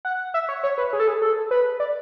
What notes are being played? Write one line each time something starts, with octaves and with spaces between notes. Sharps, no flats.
F#5
E5
C#5
C#5
B4
G#4
A4
G#4
A4
B4
D5